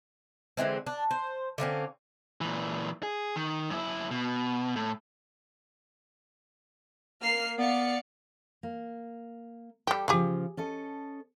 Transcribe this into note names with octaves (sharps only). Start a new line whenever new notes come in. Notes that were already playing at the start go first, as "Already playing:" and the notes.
D3 E3 G#3 C4
D4
C5
D3 A#3 C4 C#4
A#2 E3
G#4
D#3
F#2 E4
B2
A2
A#3 F6 C7
B3 D5 F5 C#7
A#3
G3 G4 A4
C#3 F3 G4 G#4 F5
C#4 A4 D#5